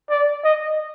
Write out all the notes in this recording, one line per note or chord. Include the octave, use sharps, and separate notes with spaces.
D5
D#5